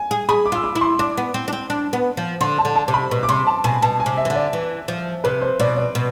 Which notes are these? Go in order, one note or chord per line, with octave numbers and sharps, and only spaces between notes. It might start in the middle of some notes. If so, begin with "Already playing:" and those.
Already playing: G#5
G#4
G#4 B5
D6
F4 E6
D6
E4
C6
D4 D6
B3
C4
D4
C4
D4
B3
F3
D3 C6
A5
D3
A5
C3
B5
B2
D6
C3 C6
A5
B2 G#5
B2 A5
G#5
C3
E5
E3
D3
D5
E3
F3
C3 B4
C5
B2 D5
D5
B2